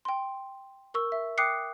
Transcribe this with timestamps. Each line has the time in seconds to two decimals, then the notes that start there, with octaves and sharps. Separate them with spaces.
0.05 G5 C6
0.94 A#4 C#6 E6
1.12 E5
1.38 G5 D6 D#6 F#6 C7 C#7